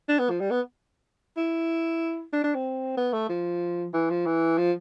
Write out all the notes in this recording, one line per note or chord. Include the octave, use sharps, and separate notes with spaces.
D4
B3
F3
G3
B3
E4
D4
D4
C4
B3
A3
F3
E3
F3
E3
F3